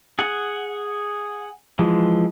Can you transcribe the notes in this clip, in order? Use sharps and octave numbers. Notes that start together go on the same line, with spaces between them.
G#4 F#5
E3 F3 G#3